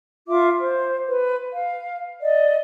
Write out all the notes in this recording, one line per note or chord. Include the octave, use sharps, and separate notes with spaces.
F4 E5 D6
C5
B4
F5
D5 D#5